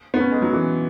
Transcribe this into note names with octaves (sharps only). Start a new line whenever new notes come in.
B3
C#4
G#3
F#3
E3